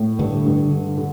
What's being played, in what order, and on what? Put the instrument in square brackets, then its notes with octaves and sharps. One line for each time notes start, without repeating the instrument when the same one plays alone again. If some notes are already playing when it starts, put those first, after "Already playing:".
Already playing: [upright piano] A2
[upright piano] G2 [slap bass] D3
[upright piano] G2
D3
D3